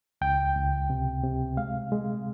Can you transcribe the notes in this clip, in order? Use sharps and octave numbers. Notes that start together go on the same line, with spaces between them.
C#2 G5
C#2
C3
C3
G#3 F5
G#3